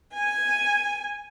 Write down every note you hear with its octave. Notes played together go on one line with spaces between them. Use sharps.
G#5